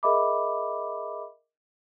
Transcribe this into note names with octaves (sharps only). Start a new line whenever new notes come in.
G#4 A#4 D#5 E5 B5 D6